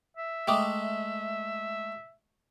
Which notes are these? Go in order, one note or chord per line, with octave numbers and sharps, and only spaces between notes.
E5
G#3 A3 G5 D6 D#6